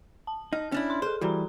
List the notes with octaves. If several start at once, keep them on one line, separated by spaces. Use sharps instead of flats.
A5
D#4 F6
C#4 D4 E4
C6
G#4 A4 C5
E3 G3 F#4 A#5